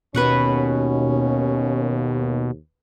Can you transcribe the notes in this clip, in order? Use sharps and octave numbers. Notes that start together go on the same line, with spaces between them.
D#2 B2 C#4 B4 F#5 C#6